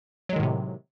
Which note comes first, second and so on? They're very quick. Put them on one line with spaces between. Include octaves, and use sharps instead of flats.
F#3 G#3 D#3 A2 C3